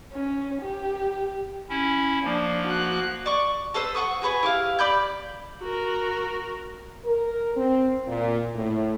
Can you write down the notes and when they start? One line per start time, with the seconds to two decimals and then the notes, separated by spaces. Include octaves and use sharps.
0.12 C#4
0.62 G4
1.69 C#4 E4
2.24 F3 A#3 D4
2.68 F#4 F#6
3.26 D5 C#6
3.74 A4 B4 C5 E6
3.95 F#5 C#6 D#6
4.22 F#4 G#4 B4 C#5
4.43 E4 G4 F5
4.79 D5 B5 G6
5.61 F#4 A#4
7.05 A#4
7.56 C4
8.07 A#2
8.55 A2